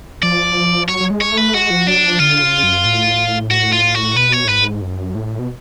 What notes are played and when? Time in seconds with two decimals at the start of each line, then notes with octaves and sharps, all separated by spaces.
0.23 F3 D5
0.88 F#3 C#5
1.01 F#3
1.10 G#3
1.21 C#5
1.32 A3
1.37 B4
1.54 G#3 F#4
1.70 F3
1.87 F#3 D4
2.04 F3
2.19 D3 F4
2.42 C#3
2.63 F#2
2.85 A2
3.51 F#4
3.72 F4
3.95 F#4
4.16 B2 B4
4.32 C#5
4.45 A2
4.49 G#2 B4
4.81 F#2
5.15 A2
5.39 B2